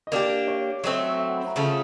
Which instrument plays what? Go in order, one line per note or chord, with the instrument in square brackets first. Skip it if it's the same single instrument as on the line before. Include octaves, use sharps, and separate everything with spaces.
[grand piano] D#5
[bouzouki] A#3 D4 G4 [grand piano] D5
[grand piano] C#5
[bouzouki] F#3 A3 C4 [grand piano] D#5
[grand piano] E5
F#5
B5
A#5
[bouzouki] C#3 F3 A3